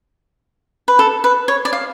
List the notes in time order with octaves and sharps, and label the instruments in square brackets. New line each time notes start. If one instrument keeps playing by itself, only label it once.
[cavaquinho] B4
A4
B4
C#5
D5
F5